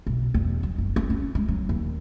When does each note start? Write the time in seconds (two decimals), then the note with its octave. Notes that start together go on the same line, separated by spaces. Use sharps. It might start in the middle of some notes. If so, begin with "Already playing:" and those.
0.07 B1
0.34 E2
0.63 F#3
0.78 F#1
0.96 C#4
1.10 C#4
1.35 G#3
1.48 F#3
1.69 D#2